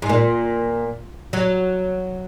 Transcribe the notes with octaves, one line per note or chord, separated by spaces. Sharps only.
G#2
A#2
F#3